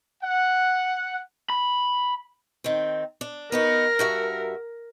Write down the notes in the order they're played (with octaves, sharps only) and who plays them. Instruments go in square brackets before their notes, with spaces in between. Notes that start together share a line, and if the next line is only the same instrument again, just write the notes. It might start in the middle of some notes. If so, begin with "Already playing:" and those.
[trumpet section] F#5
[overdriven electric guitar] B5
[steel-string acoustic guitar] D#3 C4
D4
[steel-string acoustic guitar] B3 D#4 F#4 [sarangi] A#4
[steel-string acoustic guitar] G2 F#4 E5